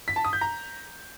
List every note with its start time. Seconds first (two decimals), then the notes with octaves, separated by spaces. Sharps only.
0.08 B6
0.16 A5
0.25 D#6
0.33 G6
0.41 A#5